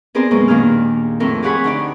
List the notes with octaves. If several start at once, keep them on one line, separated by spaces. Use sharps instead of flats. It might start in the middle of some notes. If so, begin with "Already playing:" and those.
B3 C4 G#4 A#4 C5 D5
F#2 B2 G#3 A#3 B3
D#2 A#2 D#3 D4 G#4 F6
F2 A2 C4 A4 A#4
G4 G#4 C#5 F#5 G#5 B5
D2 D#4 D5